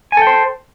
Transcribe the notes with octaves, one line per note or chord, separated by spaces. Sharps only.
A4 C5 G5 G#5